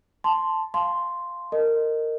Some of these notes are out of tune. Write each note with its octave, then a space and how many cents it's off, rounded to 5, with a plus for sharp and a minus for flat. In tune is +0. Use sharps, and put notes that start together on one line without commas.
A5 +0 C6 +0
F5 +0 A5 -25 C6 +0
A#4 -20 D#5 -10